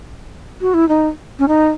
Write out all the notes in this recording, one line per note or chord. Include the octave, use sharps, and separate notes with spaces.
F#4
E4
D#4
C#4
D#4